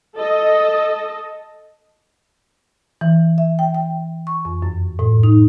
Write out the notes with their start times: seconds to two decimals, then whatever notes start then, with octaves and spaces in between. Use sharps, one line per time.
0.15 A4 D#5
3.01 E3
3.38 E5
3.59 G5
3.74 G5
4.27 C#6
4.45 F2
4.62 F#2
4.99 A2
5.23 D#4